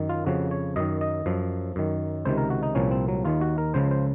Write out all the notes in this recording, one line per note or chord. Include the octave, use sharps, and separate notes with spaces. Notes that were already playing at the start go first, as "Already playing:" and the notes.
Already playing: F#2 D#3
F4
F2 C#3 F3 F#4
C#5
F#2 D#3 D#5
D#5
F#2 F3
F#2 D#3
C#2 C3 D#3 C5
A#4
F#4
D#4
C2 A#2 F3 C#4
C4
F#3
D#2 D#3 F4
F#4
A#4
C#2 C#3 F3 C5
C5